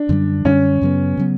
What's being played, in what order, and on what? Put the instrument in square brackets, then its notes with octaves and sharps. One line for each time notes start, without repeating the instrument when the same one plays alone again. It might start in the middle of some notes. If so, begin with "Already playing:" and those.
Already playing: [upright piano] D4
[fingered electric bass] F#2 D3 G3
[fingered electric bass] F#2 D3 G3 [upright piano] C#4
[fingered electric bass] F#2 C#3 F#3 B3
C#3 F#3 B3